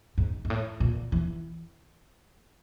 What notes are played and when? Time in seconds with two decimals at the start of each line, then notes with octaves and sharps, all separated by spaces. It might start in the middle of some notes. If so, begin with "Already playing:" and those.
0.18 G#2
0.45 G#2
0.50 A2
0.80 A#2
1.12 E3